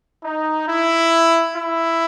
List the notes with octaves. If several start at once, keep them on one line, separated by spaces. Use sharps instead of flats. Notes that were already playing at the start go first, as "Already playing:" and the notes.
D#4
E4
E4